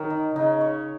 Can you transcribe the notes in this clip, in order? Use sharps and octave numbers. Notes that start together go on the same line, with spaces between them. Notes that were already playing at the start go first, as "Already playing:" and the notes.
Already playing: D#3 A#4 C#5
D#4
C#3 D#4
C#5